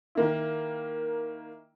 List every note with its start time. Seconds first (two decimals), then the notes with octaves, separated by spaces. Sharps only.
0.15 D#3 A#3 E4